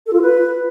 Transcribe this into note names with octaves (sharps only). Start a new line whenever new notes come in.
A4
F4
B4